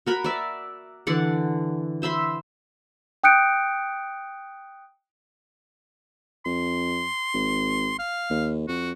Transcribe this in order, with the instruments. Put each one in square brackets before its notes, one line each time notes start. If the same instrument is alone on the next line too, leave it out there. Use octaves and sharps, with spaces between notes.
[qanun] F#4 A#4 B5
D5 E5
D3 E3 D5 F#5
C5 E5 B5 C6
[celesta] G5 D#6 F#6 G6 C#7 D7
[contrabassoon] F2 [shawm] C6
[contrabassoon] G#1
[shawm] F5
[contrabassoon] D#2
[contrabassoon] F2 [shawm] F#4